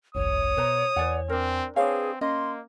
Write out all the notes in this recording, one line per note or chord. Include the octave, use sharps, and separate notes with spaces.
G1 C2 F2 C#5 D#6
B2 B4 C5 A#5
E2 B4 D5 F#5 G#5
C4 D4 A#4
C4 D4 G#4 B4 C#5 F5 G#5
A#3 C#4 D#5 C6